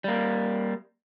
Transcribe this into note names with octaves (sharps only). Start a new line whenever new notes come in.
G3 A#3